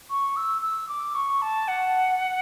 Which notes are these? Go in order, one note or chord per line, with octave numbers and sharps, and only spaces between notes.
C#6
E6
E6
D6
C#6
A5
F#5